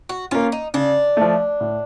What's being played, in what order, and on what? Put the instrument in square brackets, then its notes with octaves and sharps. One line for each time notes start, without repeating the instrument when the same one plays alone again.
[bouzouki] F#4
[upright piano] A#3 C#4 [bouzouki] F4
[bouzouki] D#4
[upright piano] C#3 [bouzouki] D4
[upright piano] F3 A3
A2